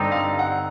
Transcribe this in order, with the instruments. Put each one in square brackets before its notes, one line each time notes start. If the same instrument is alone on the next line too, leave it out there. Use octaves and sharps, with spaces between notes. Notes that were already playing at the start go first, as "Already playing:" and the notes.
Already playing: [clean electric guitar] G2 D3 G3 C4 D#4
[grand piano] F5
F#5